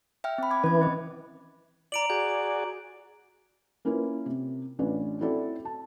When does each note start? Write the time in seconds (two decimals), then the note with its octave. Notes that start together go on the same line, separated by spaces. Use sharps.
0.24 E5 G5 F6
0.38 C4 B5
0.51 B5 D6 G#6
0.64 E3 C#4 G#6
0.82 C4 D#5
1.92 D5 A#5 D7 F#7
2.10 F#4 G#4 D5 G6
3.85 A#3 C#4 E4 F4 A#4 B4
4.26 C3
4.79 A1 C#4 D4 F4 B4
5.21 C4 E4 F#4 A4 D5
5.65 A5